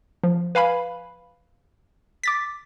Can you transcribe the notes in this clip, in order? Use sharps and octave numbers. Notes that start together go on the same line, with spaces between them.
F3
B4 F5 G#5 B5
D6 A6 B6